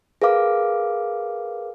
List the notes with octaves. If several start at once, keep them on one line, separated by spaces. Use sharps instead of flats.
G#4 A#4 B4 F5 D6